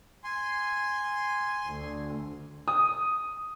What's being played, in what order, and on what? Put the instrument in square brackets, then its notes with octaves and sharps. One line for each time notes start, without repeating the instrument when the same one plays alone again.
[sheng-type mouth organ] G#5 C6
[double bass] D2
[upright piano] D#6